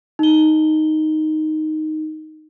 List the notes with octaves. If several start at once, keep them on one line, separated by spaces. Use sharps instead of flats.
D#4 G7